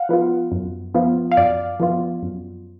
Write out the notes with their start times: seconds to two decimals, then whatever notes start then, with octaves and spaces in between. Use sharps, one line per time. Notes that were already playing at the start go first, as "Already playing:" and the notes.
Already playing: F5 F#5
0.09 F3 B3 F4
0.52 F#2
0.95 F3 B3 F4
1.31 F5
1.37 F#2 D5
1.80 F3 B3 F4
2.23 F#2